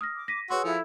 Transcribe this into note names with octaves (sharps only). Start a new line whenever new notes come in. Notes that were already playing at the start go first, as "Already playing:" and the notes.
D#6 F6 A#6
D6
A#6 B6 D#7
F#4 G#4 B4 C#5 F#5 C6 E6
F3 E4 A4